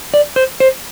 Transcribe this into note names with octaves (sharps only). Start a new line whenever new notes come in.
D5
C5
C5